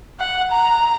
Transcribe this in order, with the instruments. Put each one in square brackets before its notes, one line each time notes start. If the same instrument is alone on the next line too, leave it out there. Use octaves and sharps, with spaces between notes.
[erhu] F#5
A#5